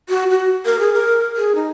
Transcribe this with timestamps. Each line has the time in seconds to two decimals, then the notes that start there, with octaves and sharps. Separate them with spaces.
0.09 F#4
0.31 F#4
0.65 A#4
0.79 G#4
0.93 A#4
1.36 G#4
1.55 D#4